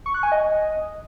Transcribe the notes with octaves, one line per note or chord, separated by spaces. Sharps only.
C#6
F#6
G#5
D#5